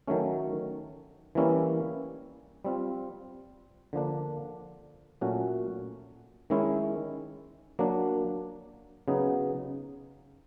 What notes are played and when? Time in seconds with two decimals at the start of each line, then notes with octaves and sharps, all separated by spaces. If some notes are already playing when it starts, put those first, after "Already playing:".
0.08 D#3 F#3 A3 C#4
1.35 E3 G3 A#3 C#4 E4
2.65 G3 C4 F4
3.93 D3 F3 A#3 D4
5.21 A#2 F#3 A3 C#4 F#4
6.50 D#3 G#3 C#4 E4
7.79 F#3 A#3 D4
9.08 C#3 F#3 B3 D#4